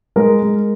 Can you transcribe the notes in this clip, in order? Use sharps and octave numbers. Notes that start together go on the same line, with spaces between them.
G#3 A#4
G#3